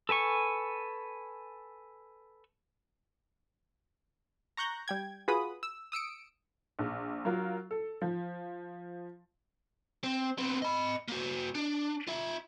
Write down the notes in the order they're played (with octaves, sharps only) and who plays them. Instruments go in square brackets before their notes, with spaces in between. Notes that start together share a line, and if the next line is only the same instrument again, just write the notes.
[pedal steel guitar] A4 B4 G#5 C#6
[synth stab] A#5 C#6 F#6 G6 A#6
G3 G5 G#6
F4 F#4 G#4 B4 B5 D#6
E6
D#6 E6 C#7 D7
[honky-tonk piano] A#1
F#3 F4 A#4
A4
F3
[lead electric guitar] C4
B3 C4
D#5 B5
A#3 F#4
D4
F4 E5